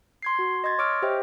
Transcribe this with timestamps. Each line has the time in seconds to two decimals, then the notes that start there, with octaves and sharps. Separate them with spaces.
0.23 C6 G#6 C7
0.39 F#4
0.64 D#5 C6 G#6 A6
0.78 C#5 C#6 D6 E6 F6 D7
1.02 G4 C5 D#5 E5 G5